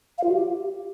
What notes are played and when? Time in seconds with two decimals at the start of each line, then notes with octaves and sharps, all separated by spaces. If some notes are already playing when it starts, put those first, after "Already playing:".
0.18 F5
0.24 F4
0.29 F#4
0.34 G4